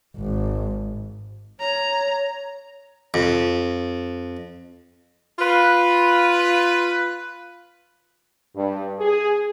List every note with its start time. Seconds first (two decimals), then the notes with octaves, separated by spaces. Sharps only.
0.17 G#1 G#2
1.60 C#5 A#5
3.14 F2
5.39 F4 B4
8.56 G2
9.00 G#4